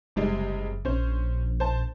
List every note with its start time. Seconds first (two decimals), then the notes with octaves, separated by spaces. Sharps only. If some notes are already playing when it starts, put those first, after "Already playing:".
0.16 F#1 C3 G3 G#3
0.85 A#1 C#4 C5
1.60 C5 A5